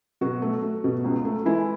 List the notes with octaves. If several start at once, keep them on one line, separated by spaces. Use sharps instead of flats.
B2 F#3 F#4
A3
A3
B2
C#2
A3
E3 G#3 E4